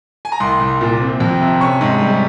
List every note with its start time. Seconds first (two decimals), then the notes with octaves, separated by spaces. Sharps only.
0.25 G#5
0.32 A#5
0.40 C2 C6
0.60 C2
0.81 A#2
1.00 C4
1.20 F2
1.41 C3
1.61 C#4 C#6
1.81 G#2
2.01 G3